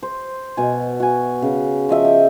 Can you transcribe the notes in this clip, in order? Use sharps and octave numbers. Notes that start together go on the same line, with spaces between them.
C5
B2 G#5
F#4 G#5
C#3
F3 D#5 E5
G4